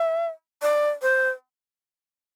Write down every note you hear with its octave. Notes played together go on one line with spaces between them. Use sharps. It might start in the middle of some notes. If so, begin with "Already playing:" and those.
Already playing: E5
D5
C5